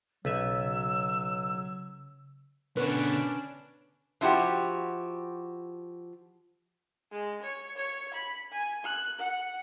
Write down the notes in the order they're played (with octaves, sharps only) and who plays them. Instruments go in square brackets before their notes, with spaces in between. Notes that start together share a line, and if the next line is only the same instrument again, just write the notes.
[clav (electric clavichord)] B1 B4 E5 [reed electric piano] C#3 [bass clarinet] F#3 [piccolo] E6
[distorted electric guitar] B2 D3 [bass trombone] C#4 [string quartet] D4 [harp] B4
[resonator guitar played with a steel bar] F3 E4 F#4 G4
[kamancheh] G#3
C#5
C#5
B5
G#5
F#6
F#5